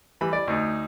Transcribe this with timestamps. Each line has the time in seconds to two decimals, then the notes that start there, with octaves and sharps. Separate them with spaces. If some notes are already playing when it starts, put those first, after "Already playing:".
0.21 E3 G3 B5
0.33 D5
0.47 D2 D#4